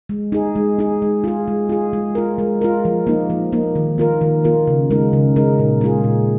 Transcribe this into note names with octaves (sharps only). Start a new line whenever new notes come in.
G#3
D#4 G#4
G#3
D#4 G#4
G#3
F4 G#4
G#3
F4 G#4
G#3
F4 A#4
G#3
F4 A#4
F3
A#3 D#4
F3
A#3 D#4
D#3
A#3 F4 A#4
D#3
A#3 F4 A#4
C#3
G#3 D#4 A#4
C#3
G#3 D#4 A#4
A#2
G#3 F4 G#4
A#2